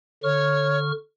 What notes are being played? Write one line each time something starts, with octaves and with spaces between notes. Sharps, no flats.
D3 C#5 C#6 F6